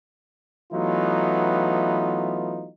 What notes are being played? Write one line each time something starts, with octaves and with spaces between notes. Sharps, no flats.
E3 F#3 A3 B3 D#4 F4